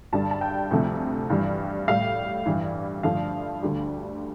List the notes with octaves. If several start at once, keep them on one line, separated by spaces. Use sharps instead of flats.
G2 D3 G3 A5
A5
G5
D2 C3 F3 A3
G2 E3 G3
A2 G3 F5
G2 E3 G3
G2 D3 F3 A3 F5
D2 D3 G3